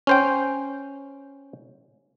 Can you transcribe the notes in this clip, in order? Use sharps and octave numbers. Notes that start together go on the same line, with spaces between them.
C#4 C5 G5